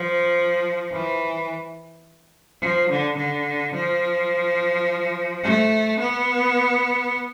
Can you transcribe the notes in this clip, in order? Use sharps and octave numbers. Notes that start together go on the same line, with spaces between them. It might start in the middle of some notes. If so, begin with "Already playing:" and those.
Already playing: F3
E3
F3
D3
D3
F3
A3
B3